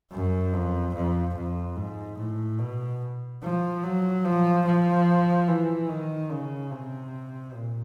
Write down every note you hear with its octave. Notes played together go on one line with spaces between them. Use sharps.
F#2
F2
F2
F2
G#2
A2
B2
F3
F#3
F3
F3
E3
D#3
C#3
C3
A#2